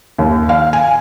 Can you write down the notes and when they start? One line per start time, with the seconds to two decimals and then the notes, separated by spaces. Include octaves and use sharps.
0.18 D#2
0.49 F5
0.73 G#5